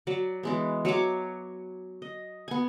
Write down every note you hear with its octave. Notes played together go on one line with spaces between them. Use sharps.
F#3 D5
E3 G#3 B3
F#3 C#5 G#5 D6
D#5
B3 G#5